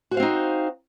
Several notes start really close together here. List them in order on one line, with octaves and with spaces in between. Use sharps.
F#4 C5 F5 C4 D#4